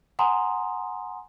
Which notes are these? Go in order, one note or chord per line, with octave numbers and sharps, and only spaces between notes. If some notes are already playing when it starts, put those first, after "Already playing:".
F#5 G#5 A#5 C6 D#6